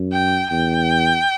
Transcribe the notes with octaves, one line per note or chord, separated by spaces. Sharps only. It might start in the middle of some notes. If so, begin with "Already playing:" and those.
Already playing: F#2
G5
E2 G5